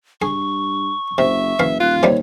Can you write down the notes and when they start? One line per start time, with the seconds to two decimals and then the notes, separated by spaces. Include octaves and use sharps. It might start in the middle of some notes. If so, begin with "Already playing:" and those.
0.22 G2 G#4 C#6
1.18 F#1 C3 E5
1.60 F#1 E3 F5
1.80 D#1 F4 F#6
2.03 D#2 C3 D#3 G3 C#5